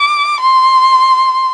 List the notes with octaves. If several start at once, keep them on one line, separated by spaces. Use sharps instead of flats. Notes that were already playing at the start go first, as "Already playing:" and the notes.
Already playing: D6
C6